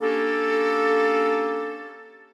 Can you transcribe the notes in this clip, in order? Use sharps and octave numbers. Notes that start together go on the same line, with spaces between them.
A#3 C#4 D4 G4 A4